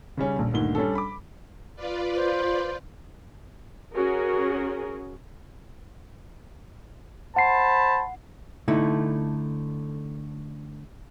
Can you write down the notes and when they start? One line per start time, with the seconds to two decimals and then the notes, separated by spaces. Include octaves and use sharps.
0.17 C#3 G3 C#4
0.36 D#1 A#1
0.53 D2 G2 A#2 D#3 G7
0.75 G3 C#4 D4 A4
0.95 B5 D6
1.76 F4 B4 D5
2.15 C5
3.94 C#4 F#4 G#4 A#4
7.36 C5 F#5 A5 B5 C7
8.68 D3 A3 D#4 E4